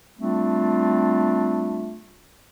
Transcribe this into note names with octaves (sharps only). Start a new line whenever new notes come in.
G3 A3 C4 D4 F4